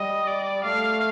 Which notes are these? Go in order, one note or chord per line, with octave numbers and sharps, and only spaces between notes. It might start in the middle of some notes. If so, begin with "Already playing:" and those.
Already playing: G3 D#5
D5
A3 F5